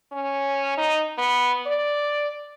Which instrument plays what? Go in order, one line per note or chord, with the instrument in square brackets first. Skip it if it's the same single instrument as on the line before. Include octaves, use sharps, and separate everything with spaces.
[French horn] C#4
D#4
B3
D5